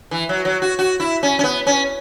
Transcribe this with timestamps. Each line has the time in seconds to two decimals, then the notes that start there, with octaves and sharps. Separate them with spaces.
0.11 E3
0.29 F#3
0.45 F#3
0.62 F#4
0.79 F#4
1.00 E4
1.23 C#4
1.39 C#4
1.44 B3
1.67 C#4